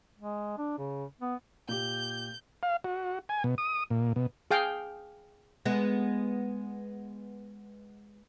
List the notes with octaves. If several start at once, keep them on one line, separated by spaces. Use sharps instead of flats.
G#3
D4
C#3
B3
A#2 G4 G6
F5
F#4
G#5
B2
D#6
A#2
B2
G#4 F5 G5
G#3 B3